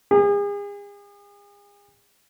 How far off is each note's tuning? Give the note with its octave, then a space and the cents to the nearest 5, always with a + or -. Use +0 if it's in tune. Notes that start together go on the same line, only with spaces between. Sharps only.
G#4 -40